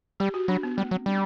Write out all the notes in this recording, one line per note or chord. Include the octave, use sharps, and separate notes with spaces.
G3 G4
F#4
F#3 D4
B3
G3 A3
F#3 C4
G3 D4